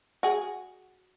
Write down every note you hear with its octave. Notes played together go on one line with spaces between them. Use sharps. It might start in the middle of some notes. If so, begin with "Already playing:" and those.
F#4 G#4